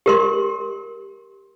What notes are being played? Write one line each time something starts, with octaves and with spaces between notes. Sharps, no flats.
G4 A#4 C6